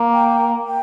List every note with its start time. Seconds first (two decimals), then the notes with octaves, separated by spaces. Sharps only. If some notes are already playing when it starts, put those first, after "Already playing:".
Already playing: A#3
0.13 G5
0.67 G5